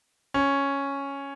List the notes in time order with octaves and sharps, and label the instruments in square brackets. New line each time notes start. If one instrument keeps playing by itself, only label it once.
[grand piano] C#4